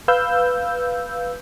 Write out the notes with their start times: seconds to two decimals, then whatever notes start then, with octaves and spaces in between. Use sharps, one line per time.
0.08 B4 F5 E6 G6